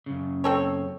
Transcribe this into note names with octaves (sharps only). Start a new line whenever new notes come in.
F#2 C#3
C4 A4 C#5